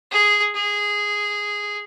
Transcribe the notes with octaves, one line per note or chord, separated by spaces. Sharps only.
G#4
G#4